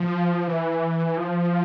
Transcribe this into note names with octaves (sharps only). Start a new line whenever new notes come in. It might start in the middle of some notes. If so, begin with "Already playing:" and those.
Already playing: F3
E3
F3